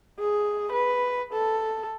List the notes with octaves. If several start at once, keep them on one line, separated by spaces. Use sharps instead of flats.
G#4
B4
A4